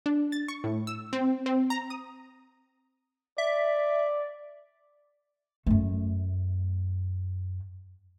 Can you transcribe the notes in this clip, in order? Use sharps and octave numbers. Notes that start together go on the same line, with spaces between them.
D4
A6
C#6
A2
E6
C4
C4
A#5
D#6
D5 E5
F#2 A3